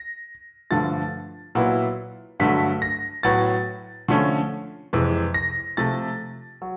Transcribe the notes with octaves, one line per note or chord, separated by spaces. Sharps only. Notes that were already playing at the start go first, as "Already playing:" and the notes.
Already playing: A#6
G2 D3 F3 A3 A6
A#2 F#3 B3 E4
G2 D3 F#3 A3 B6
A#6
A2 F#3 B3 A6
D3 F3 A3 C#4
F2 C3 E3 G#3
A#6
C3 F3 A3 A6
F#3